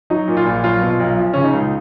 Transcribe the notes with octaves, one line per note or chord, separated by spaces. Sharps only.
F#3 D#4
A#2
F4
A#1
F#3 F4
B2
F4
B1
F3
C#3 C#4
D#4
C#2